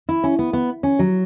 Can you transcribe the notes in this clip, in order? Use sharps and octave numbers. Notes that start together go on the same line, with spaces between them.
E4
C#4
B3
B3
C#4
F#3